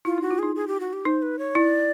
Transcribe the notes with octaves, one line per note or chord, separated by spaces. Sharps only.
E4 F4
D#4 F#4
F4
D#4 G#4
G#4
G4
F#4
G4
D#4 C5
B4
C#5
E4 D5